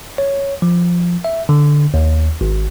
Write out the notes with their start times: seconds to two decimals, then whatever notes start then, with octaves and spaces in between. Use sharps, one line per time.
0.18 C#5
0.62 F3
1.24 E5
1.49 D3
1.94 D#2
2.41 G#1